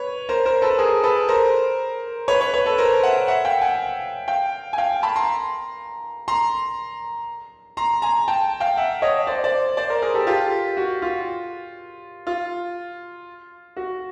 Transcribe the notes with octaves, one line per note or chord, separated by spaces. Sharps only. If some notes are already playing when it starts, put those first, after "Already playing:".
Already playing: B4 C#5
A#4 C5
A#4 C5
A4 B4
G#4 A#4
A4 B4
A#4 C5
B4 C#5
B4 C#5
B4 C#5
A4 B4
A#4 C5
E5 F#5
E5 F#5
F5 G5
F#5 G#5
F5 G5
G#5
F5 G5
A5 B5
A#5 C6
A#5 C6
A#5 C6
G#5 A#5
G5 A5
F5 G5
E5 F#5
C#5 D#5
C5 D5
C5 D5
C5 D5
A#4 C5
G#4 A#4
G4 A4
F4 G4
F#4
F4
F4
F#4